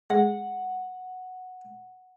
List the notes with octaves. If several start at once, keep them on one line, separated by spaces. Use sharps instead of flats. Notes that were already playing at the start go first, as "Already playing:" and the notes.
G#3 F#5